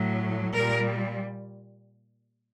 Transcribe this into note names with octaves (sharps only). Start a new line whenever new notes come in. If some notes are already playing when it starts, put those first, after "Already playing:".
Already playing: A2 F#3
A#2 G3 A#4